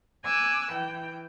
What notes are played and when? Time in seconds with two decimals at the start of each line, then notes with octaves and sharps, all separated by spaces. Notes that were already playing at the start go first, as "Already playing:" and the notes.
0.23 G#5 D6 E6 F#6
0.72 E3 G5